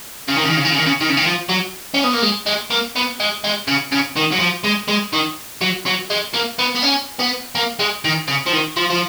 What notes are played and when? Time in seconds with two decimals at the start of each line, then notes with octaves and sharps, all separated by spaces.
0.28 C#3
0.36 D#3
0.43 C#3
0.50 D#3
0.57 C#3
0.65 D#3
0.72 C#3
0.79 D#3
0.86 C#3
1.01 D#3
1.09 C#3
1.17 D#3
1.25 F3
1.49 F#3
1.94 C#4
2.04 B3
2.13 A#3
2.22 G#3
2.46 G#3
2.70 A#3
2.96 B3
3.20 G#3
3.44 G#3
3.68 C#3
3.92 C#3
4.17 D#3
4.32 F#3
4.40 F3
4.64 G#3
4.88 G#3
5.13 D#3
5.61 F#3
5.86 F#3
6.10 G#3
6.34 A#3
6.59 B3
6.75 B3
6.83 C#4
7.19 B3
7.55 A#3
7.79 G#3
8.05 D#3
8.28 C#3
8.46 F3
8.53 D#3
8.77 F3
8.90 F3